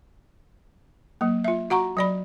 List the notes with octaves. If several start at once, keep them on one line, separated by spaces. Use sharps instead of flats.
F#3 A#3
F4 E5
F#4 F#5 A#5 C#6
F#3 D5 B5